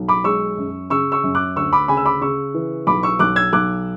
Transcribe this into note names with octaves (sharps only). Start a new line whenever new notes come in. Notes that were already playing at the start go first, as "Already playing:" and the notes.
Already playing: B1
B5 D6
G#3 C#6 E6
F#2
C#3 C#6 E6
C#6 E6
F#2
D6 F#6
D2 C#6 E6
B5 D6
C#3 G#5 B5
E6
B5 D6
C#3 C#6 E6
E3
B1 B5 D6
C#6 E6
B1 D6 F#6
E6 G#6
B1 D6 F#6